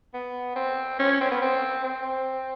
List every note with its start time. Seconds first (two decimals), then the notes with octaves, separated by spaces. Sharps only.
0.14 B3
0.56 C4
0.99 C#4
1.21 C4
1.31 B3
1.42 C4
1.84 C4